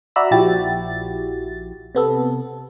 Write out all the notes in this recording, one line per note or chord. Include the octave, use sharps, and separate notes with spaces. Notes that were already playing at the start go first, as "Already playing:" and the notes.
F#4 D5 E5 A#5 B5 E6
A#1 F3 E4 F#4 G4 A6
C3 B3 A4